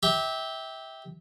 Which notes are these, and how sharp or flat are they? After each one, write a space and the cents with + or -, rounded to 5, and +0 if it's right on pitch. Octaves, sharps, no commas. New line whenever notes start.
G4 +0 E5 -25